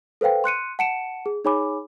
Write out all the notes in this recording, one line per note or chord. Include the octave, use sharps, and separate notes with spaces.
A4 B4 C5 F5 G5
C6 F#6 C#7 D#7
F#5 A5 C#7 D7 E7
G#4
D#4 G#4 C#5 G#5 B5 D6